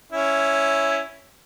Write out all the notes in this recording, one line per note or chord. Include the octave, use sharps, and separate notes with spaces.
C#4 E4